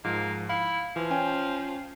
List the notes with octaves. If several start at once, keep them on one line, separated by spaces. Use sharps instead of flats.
G#2 F3 A#3
E4 F5
E3 F3
C#4 G5 G#5